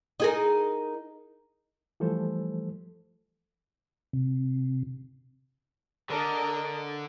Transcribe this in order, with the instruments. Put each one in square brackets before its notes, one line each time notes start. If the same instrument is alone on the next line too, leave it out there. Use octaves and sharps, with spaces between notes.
[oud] D#4 G#4 A#4
[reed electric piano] E3 F3 G3 A3 A4 C5
[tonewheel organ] C3
[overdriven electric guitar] D3 [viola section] D4 A4 D#5 [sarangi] A#4